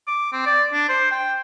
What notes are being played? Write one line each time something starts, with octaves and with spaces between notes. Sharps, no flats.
D6
C4
D5
D4
C5
G5